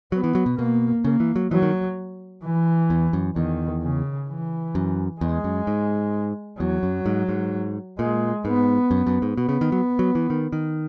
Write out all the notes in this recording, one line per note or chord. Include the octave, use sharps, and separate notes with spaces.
F#3 B3
E3
F#3
B2
B2 A#3
C#3 A#3
E3
F#3
E3 F#3
D#3
E3
E2
F#2
E2 D#3
C#3
E3
F#2
E2 G#3
F#2
G#2
E2 F#3
F#2
G#2
G#2
A#2 G#3
G#2 B3
F#2
F#2
G#2
B2 B3
C#3
D#3
F#3
F#3
E3
D#3
D#3